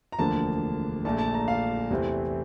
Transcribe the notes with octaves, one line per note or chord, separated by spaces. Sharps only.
A#5
E1 D2 D3 F3 A#3 A5
A#1 A#2 A3 A5
A5
A#5
F5
E2 C3 E3 A3 C4